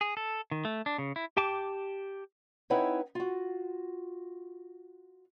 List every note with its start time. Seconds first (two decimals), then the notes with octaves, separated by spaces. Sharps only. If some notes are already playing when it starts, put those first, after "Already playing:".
0.01 G#4
0.17 A4
0.51 D#3
0.65 A3
0.86 D4
0.98 C#3
1.16 E4
1.37 G4 G5 A5 D6
2.70 C4 D#4 E4 B4 C#5 F#5
3.15 F4 F#4